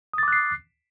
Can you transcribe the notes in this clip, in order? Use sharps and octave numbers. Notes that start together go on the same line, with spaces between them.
D6 D#6 F#6 A6 C7